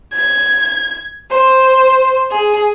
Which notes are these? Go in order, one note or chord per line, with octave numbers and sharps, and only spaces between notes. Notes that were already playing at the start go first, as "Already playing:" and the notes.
G#6
C5
G#4